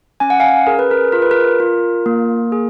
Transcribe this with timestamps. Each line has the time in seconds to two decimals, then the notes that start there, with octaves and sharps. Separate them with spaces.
0.20 C#4 G#5
0.30 F#5
0.40 F5 G#5
0.67 G#4 A#4
0.79 B4
0.91 A#4
1.12 F4 A#4
1.22 B4
1.31 A#4
1.60 F4
2.06 A#3
2.52 G#4